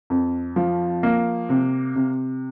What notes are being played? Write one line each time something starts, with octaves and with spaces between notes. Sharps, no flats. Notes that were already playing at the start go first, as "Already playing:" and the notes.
F2
F3
A#3
C3
C3